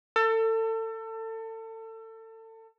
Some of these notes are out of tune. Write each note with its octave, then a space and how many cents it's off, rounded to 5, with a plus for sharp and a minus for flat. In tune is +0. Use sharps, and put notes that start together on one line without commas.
A4 +30